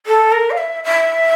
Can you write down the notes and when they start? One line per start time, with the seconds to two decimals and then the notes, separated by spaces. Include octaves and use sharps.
0.06 A4
0.31 A#4
0.50 F5
0.57 E5
0.84 E5